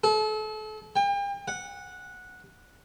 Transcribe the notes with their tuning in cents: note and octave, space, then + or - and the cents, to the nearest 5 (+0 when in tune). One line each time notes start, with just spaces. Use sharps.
A4 -35
G5 +40
F#5 -10